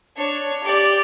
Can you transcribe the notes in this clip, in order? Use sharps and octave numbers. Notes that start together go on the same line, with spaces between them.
D4 C#5
G4 D5